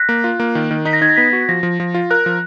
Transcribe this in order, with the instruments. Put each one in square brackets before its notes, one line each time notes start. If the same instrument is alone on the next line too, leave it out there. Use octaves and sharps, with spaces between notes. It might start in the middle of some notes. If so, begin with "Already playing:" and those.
Already playing: [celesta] F#6 A#6 B6
[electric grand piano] A#3
F4
A#3
D#3
D#3
[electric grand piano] D#4 [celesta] B6
[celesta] A#6
[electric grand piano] D#4 [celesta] G#6
[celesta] A#6
[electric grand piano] B3 [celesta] B6
[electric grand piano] F#4
[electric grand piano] F3 [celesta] A#6
[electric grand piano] F3
F3
F4
[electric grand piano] A#4 [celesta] F#6
[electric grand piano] F3